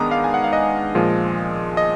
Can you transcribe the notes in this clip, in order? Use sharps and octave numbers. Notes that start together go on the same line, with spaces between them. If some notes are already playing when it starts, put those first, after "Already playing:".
Already playing: D#3 G#3 B3 D4 A#5 D6 D#6
F5
G#5
F#5
F5
D#5
A#2 F3 G#3
D#5